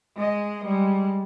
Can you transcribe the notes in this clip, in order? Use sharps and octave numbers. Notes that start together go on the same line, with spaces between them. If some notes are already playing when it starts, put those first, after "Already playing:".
G#3 D#5
G3 G#3